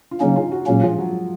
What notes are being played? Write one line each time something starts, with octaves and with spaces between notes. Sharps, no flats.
F4
C#3 F#3 A#3 C#4 D#4
F4
F#4
A#2 F#3 G#3 A#3 C#4
F3
F#3